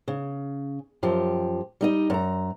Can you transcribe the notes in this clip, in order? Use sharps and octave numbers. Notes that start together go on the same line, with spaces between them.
C#3
F#2 F3 G4
G3 D#4 D#5
F#2 A#5